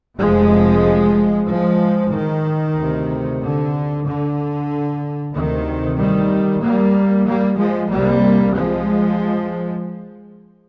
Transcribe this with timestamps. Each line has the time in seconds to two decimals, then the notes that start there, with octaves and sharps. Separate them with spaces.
0.19 F1 F2 C3 F3 G#3
1.48 F3 G#3
2.12 D#3
2.76 D2 C3
3.41 D3
4.05 D3
5.33 D2 C3 D#3
5.98 D#3 G3
6.62 G3 A#3
7.26 G3 A#3
7.58 F3 G#3
7.90 C2 C3 G3 A#3
8.54 F3 G#3